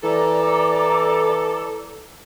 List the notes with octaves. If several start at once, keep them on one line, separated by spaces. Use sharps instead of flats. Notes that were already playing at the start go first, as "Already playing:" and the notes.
E3 A4 D5 A#5 D6